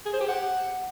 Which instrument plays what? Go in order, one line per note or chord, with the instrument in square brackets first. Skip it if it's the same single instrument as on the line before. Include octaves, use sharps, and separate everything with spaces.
[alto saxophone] G#4
C5
G4
F#5